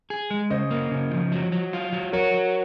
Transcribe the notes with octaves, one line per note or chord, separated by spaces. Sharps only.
G#4
G#3
C#3 C5 D#5
A#3
C#3
F3
F#3
F#3
F4
F#3
F#4 A#4 C#5
F#3